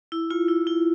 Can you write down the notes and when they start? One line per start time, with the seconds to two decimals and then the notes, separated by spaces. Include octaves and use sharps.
0.12 E4
0.30 F4
0.48 E4
0.67 E4